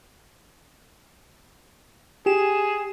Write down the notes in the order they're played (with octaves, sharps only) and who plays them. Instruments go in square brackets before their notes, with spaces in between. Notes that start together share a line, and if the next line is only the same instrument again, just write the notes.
[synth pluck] G4 E7 [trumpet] G#4